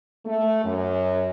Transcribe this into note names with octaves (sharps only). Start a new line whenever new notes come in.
A3
F#2